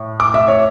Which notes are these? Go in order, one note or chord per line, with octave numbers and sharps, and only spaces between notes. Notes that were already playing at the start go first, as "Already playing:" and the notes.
Already playing: A2
D6
E5
C#5